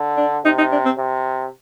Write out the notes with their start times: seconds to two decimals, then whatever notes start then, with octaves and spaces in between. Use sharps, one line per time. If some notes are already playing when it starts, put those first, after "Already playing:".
Already playing: D3
0.17 D4
0.45 C3 D#4
0.58 D#4
0.72 D4
0.85 C4
0.98 C3